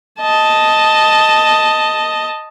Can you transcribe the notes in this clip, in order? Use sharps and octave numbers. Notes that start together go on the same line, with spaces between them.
D#5 A5